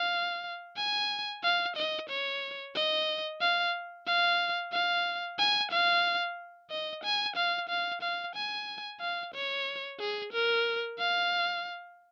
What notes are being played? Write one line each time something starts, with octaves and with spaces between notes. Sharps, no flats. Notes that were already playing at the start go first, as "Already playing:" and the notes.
Already playing: F5
G#5
F5
D#5
C#5
D#5
F5
F5
F5
G#5
F5
D#5
G#5
F5
F5
F5
G#5
F5
C#5
G#4
A#4
F5